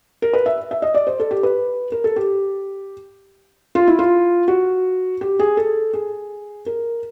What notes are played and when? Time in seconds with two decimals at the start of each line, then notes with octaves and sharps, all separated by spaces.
0.22 A#4
0.33 B4
0.46 E5
0.71 E5
0.82 D#5
0.94 D5
1.07 C5
1.20 A4
1.31 G4
1.43 B4
1.92 A#4
2.04 A4
2.16 G4
3.75 F4
3.88 E4
3.99 F4
4.48 F#4
5.21 G4
5.39 G#4
5.57 A4
5.93 G#4
6.66 A#4